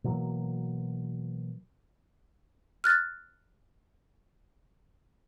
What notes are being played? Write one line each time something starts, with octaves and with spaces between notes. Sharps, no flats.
B2 E3 F#3 A#3
F6 F#6 A6